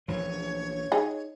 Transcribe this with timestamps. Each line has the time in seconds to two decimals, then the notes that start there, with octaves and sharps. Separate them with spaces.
0.08 A#1 E3 F3 C#5
0.92 D#4 G#4